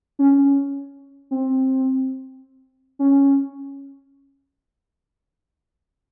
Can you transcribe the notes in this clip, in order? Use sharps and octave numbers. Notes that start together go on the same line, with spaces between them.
C#4
C4
C#4